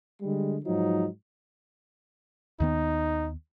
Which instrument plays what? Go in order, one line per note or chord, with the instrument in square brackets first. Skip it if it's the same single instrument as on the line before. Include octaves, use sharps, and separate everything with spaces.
[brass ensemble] D3 G3 G#3
G#2 F3 F#3 D#4
[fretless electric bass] D#2 D#3 B3 [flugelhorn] D#4